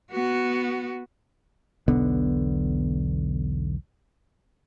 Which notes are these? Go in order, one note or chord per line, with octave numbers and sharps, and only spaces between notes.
B3 F#4
E1 B1 D3 B3